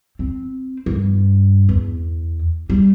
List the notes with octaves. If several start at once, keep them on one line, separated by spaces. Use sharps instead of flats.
C4
G2
E2
G3